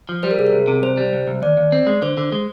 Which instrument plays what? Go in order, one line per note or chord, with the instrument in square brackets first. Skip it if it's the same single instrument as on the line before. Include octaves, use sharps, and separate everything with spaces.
[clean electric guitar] F3
[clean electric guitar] G3 [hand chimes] C5
[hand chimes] A#4
[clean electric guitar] C2 [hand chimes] G#4
[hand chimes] A#4
[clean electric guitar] C2
C3
[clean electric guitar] C2 [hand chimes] C5
[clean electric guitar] G3
C2
C2
[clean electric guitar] D#2 [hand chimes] D5
[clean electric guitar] D#2
C4
G#3
[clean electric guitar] D3 [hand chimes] C5
[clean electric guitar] D3
G#3